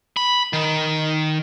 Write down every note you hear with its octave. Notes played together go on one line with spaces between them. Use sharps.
B5
D#3